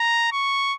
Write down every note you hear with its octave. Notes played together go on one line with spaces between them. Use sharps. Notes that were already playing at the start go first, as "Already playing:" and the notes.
Already playing: A#5
C#6